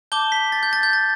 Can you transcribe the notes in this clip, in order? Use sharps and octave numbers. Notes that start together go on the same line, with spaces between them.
A5 D6 G6 G7
B6
A6
G6
A6
G6
A6